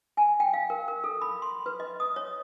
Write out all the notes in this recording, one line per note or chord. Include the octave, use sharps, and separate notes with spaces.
G#5
G5
F5
A#4
A#4
A4
B5
C6
B4
D#5
D#6
C#5